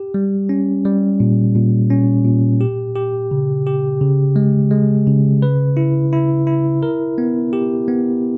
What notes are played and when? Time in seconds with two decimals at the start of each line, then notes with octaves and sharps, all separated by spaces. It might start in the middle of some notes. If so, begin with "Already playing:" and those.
Already playing: G4
0.14 G3
0.49 C#4
0.85 G3
1.20 A#2
1.56 A#2
1.90 C#4
2.25 A#2
2.61 G4
2.96 G4
3.31 C#3
3.67 G4
4.01 C#3
4.36 G#3
4.71 G#3
5.07 C#3
5.42 B4
5.77 E4
6.13 E4
6.47 E4
6.83 A#4
7.18 B3
7.53 G4
7.88 B3